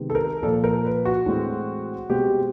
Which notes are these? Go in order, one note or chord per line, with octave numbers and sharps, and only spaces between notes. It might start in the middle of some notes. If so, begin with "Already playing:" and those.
Already playing: C3 D#3 G#3 B3
A4
A#4
A#2 F3 A#3 A4
A#4
B4
F#4
A2 E3 G#3 C4
B2 G#3 C4 G4